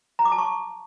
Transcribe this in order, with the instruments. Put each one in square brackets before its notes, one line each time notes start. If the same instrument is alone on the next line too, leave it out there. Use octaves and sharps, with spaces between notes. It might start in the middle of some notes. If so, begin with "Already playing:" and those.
[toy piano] A#5
D6
A5
C#6